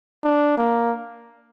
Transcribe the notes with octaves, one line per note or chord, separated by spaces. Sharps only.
D4
A#3